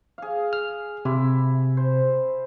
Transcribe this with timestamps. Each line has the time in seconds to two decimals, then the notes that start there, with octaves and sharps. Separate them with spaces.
0.18 G#4 F5
0.53 F6
1.05 C3 E4
1.77 C5